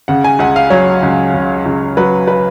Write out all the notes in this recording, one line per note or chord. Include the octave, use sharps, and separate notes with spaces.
C#3 F#5
G#5
C#2 F#5
F5
F#3 C#5
C#2
C#3
C#2
F#3 B4
B4